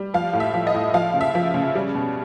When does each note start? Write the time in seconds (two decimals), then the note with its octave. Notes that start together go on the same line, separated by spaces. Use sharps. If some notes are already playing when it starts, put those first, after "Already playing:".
Already playing: G3
0.14 F3 F5
0.33 A2
0.40 E5
0.54 F3
0.67 D#5
0.74 A2
0.94 F3 F5
1.14 C#3
1.21 E5
1.35 F3
1.54 C#3
1.75 G3
1.94 B2